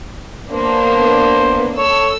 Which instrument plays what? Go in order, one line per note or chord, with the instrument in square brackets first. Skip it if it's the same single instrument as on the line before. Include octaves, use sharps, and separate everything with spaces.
[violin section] A#3 B3 D4 [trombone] C5
[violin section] A4 E6 [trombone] C#5